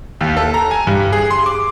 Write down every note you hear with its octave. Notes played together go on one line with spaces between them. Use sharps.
D#2
A4
A#5
G#5
G2
G#4
C6
D6